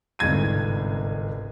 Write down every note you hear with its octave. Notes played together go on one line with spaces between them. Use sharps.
G1 C2 G#2 G#6 D#7